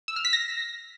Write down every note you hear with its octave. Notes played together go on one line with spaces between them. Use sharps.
E6
F6
B6
A#6